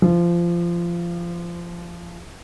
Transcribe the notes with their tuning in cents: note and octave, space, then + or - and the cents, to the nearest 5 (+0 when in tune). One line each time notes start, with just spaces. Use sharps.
F3 -20